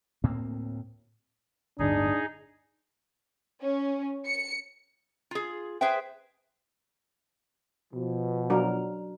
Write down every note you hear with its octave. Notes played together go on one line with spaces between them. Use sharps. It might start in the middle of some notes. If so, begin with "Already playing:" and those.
D2 A2 A#3 C4
D1 G1 D2 D4 D#4 G#4
C#4
C#7
F4 G#4
G#4 B4 C5 E5 G5
B2 F3
F#3 D4 A#4